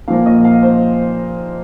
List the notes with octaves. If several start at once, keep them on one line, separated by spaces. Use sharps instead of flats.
A#2 F3 A#3 F5
D#5
F5
C5